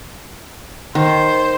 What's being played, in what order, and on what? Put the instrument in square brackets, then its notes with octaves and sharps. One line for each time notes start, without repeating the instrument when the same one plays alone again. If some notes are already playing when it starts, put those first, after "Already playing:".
[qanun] D#3 [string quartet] C5